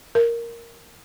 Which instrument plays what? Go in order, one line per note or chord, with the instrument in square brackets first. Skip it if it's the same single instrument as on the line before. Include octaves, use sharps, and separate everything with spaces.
[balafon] A#4